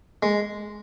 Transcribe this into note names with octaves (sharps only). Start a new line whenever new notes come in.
G#3